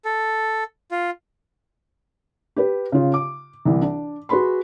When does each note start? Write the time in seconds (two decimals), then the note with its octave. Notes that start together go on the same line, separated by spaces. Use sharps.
0.05 A4
0.91 F4
2.56 G4 B4
2.92 C#3 F4
3.14 D6
3.65 C2 E3
3.82 D4
4.29 F#4 G#4 B4 B5 C6